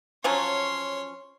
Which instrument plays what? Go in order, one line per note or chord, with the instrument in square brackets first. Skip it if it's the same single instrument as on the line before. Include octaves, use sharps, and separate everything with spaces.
[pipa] F3 F#3 C#4 [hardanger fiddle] C#5 C6